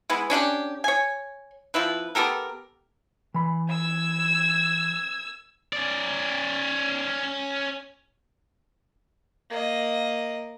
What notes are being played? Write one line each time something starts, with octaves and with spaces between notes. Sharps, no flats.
G#3 B3 E4
C#4 D4 F4 G4
C#5 G#5
F3 C4 E4 B4
B3 G4 A4 A#4
E3 B5
E6 G#6
C#4 D5
A#3 D#5